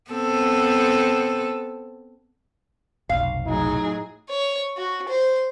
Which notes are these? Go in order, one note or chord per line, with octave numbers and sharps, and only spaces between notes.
B3 C4 A4
F1 B1 F5
A2 F#3 D#4 G#4
C#5
F#4
C5